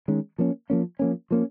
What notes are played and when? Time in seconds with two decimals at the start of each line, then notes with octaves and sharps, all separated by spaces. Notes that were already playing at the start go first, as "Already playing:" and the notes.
0.08 D#3 G#3 C#4
0.38 F3 A#3 C#4
0.70 F3 A#3 C#4
0.99 F3 A#3 C#4
1.31 F3 A#3 C#4